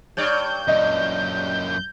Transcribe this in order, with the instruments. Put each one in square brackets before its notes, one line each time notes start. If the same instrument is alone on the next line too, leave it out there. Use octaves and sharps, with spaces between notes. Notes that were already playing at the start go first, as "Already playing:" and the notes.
[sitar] G2 C#5 D5 [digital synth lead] G6
[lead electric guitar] F#2 A#2 [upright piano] D#5